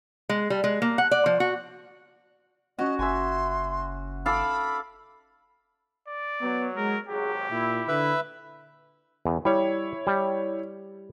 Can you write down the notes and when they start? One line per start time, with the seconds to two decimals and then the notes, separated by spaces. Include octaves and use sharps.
0.29 G#3
0.50 G3
0.64 G#3
0.82 A#3
0.98 F#5
1.11 D5
1.26 F3
1.40 F#4
2.79 C#4 F#4 D#5
2.99 F#1 E5 G#5 C6
4.26 A4 D5 F5 B5
6.08 D5
6.42 F#3 B3
6.76 G#3 A#4
7.09 G#1 F#3 G4 G#4
7.51 A#2 E4
7.88 D3 B4 E5
9.25 E2
9.45 G3 E4 C#5
10.07 G3